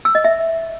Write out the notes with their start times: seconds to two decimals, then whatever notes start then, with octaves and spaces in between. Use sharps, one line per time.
0.05 E6
0.15 D#5
0.25 E5